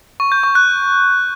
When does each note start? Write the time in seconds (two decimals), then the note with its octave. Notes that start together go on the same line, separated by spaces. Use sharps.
0.20 C#6
0.32 G6
0.43 C#6
0.55 F#6